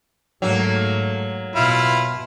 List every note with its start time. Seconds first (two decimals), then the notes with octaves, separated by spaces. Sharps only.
0.42 G#2 F#3 A3 A#3
1.55 B2 E4 F4 F6